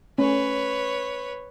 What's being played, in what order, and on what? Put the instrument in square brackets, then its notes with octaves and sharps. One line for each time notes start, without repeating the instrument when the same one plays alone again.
[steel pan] A3 C#4 [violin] B4 C#5